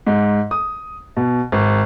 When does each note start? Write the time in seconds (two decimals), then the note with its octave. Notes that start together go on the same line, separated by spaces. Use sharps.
0.07 G#2
0.51 D#6
1.17 B2
1.52 G#1